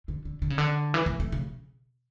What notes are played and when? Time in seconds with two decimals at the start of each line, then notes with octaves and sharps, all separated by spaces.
0.08 D3
0.25 D3
0.42 D3
0.50 C#3
0.58 D3
0.94 E3
1.06 A3
1.20 A3
1.32 C#3